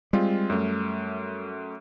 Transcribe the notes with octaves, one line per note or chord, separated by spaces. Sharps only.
G3 G#3 C4 F4
F#2 A3